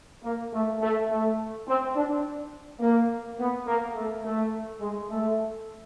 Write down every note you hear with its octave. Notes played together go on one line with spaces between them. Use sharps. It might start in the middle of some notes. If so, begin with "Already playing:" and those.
A#3
A3
A3
A3
C4
D4
A#3
B3
A#3
A3
A3
G#3
A3